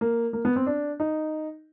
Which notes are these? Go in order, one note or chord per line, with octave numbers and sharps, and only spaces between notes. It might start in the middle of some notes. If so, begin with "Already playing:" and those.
A#3
A#3
B3
C4
D4
D#4